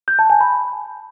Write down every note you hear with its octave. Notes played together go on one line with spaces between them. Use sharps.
G6
A5
G#5
B5